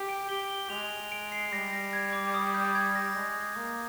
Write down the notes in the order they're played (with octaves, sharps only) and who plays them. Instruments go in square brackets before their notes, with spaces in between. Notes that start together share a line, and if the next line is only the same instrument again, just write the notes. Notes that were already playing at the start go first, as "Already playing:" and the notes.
Already playing: [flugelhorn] G4
[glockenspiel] D7
[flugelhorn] G4 [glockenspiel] G7
[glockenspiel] G7
[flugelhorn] G#3 [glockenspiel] F7
[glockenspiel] D7
C7
[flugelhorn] G3 [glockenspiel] A#6
[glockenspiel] A#6
G#6
D6
D#6
G6
G#6
A#6
[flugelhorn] G#3
A#3